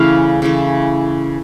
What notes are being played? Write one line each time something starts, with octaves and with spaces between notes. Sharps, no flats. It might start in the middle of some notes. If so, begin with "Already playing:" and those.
Already playing: C#3 E3 A3 F5
C#3 E3 A3